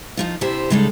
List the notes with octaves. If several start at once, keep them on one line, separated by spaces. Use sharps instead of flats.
F3 D#4 F4
C3 D4 E4 G4 C5
C#3 G3 G#3 D#4 G#4 A4